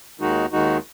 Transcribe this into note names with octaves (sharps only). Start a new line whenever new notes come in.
D#2 D#3 G#3 D#4 F#4
D#2 D#3 G#3 D#4 F#4